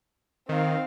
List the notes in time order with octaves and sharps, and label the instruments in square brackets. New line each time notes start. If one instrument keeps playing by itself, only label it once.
[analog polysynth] D#3 [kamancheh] C4 F5